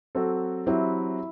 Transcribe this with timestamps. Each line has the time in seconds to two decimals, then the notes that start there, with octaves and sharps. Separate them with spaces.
0.15 F#3 C4 F#4 A4
0.66 F#3 C4 E4 G4